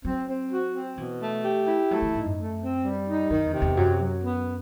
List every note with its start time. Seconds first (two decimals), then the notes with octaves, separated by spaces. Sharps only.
0.05 F#3 C4
0.28 C4
0.52 F#4
0.75 C4
0.98 B2 E3
1.21 A3
1.45 G4
1.68 E4
1.91 F#3 A3
2.02 E3
2.15 A2 D#4
2.25 F#2
2.37 A3
2.61 C4
2.84 G3
3.08 D#4
3.31 F#2 D#3
3.46 E2
3.53 C3
3.62 E2
3.77 F#2 F#3
4.00 F#3
4.24 B3